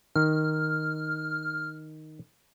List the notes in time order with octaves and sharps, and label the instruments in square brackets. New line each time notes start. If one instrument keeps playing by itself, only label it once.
[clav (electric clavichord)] D#3 [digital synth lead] F6